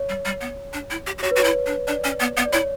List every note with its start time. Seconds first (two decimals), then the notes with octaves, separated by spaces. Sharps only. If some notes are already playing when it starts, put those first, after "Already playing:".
Already playing: C#5
0.09 G3
0.25 G3
0.41 B3
0.73 D4
0.90 E4
1.07 G4
1.18 G4
1.23 F#4 C#5
1.31 B4
1.36 F#4 C#5
1.44 E4
1.66 D4
1.87 D4 D5
2.04 C#4
2.20 B3
2.37 B3
2.46 D5
2.53 E4 C#5